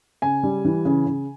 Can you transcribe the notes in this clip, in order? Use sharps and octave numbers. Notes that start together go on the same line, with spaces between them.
C#3 G#5
G3
E3
C#3
C#3